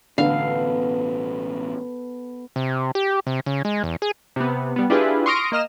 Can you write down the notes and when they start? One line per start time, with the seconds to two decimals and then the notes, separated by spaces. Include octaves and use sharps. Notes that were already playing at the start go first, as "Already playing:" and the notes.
0.18 A1 B2 D3 B3 A4 F5
2.56 C3
2.95 G4
3.27 C3
3.46 C#3
3.65 G#3
3.84 E2
4.02 G#4
4.36 C3 B3
4.76 G3 B3
4.90 D4 E4 F4 G4 G#4 B4
5.26 C6 C#6 D#6 F6 A#6 D7
5.52 A#3 D#5 F6 E7